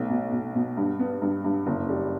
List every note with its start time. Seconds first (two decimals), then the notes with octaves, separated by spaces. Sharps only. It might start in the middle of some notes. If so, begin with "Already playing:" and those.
Already playing: B1 A3
0.10 B2
0.32 B2
0.55 B2
0.77 G2
0.99 B3
1.22 G2
1.44 G2
1.66 F#1
1.89 G3